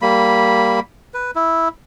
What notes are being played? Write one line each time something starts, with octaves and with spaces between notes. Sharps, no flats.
G3 A#3 B5
B4
E4